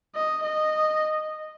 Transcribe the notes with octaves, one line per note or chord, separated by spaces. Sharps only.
D#5
D#5